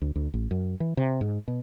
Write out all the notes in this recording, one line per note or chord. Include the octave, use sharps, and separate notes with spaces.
D2
D2
A1
F#2
E3
C3
G#2
B2